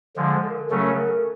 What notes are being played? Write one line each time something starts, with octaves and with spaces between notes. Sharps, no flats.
D3 F3 G#3
A4
A#4
A4
C#3 F#3 A3 C#4 A#4
A#4
A4